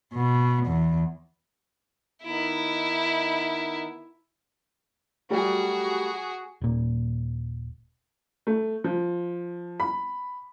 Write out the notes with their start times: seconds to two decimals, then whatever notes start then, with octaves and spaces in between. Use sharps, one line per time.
0.14 B2
0.67 E2
2.24 D#3 B3 D#4 E4
5.30 F#3 G3 A3 F#4 G#4
6.61 D#1 A#2
8.47 A3
8.84 F3
9.80 B5